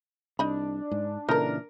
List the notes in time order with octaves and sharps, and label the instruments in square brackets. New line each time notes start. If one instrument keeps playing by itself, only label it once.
[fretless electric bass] C2 [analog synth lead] D4 [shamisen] D#4 D#5 B5
[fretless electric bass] G#2
[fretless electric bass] A#2 C#3 E3 [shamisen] D#4 A4 [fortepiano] A#4 A#5